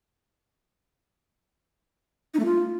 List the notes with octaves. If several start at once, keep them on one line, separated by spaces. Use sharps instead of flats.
D#4
A3
F4